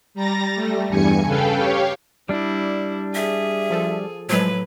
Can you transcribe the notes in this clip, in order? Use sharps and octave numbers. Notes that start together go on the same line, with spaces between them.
G3 A#5 A6 A#6
G3 A3
E2 G2 G#5 C#7
C#3 A4 B4 F5 G5
G4 C#5 F5
G3 D4 E4
G#4 E5
F3 A4
A2 F3 F#3 G#3 B4